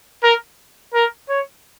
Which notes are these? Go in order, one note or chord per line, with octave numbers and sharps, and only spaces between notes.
A#4
A#4
C#5